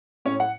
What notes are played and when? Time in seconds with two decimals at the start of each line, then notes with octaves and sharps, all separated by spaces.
0.25 A2 C#4 C#5
0.40 F#5